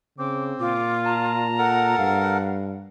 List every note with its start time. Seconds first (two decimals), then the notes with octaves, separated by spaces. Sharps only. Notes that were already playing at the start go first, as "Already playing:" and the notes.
0.18 C#3 C4 D6
0.60 A#2 F4 D6
1.05 A5 A#5
1.58 A4 A#4 F#5
1.98 G2 F5